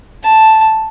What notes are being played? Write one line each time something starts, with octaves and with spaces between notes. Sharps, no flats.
A5